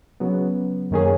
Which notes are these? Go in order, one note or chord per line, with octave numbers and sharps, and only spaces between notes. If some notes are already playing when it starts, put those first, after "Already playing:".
C#3 F#3 B3
F#2 D#3 A#3 C#4 G#4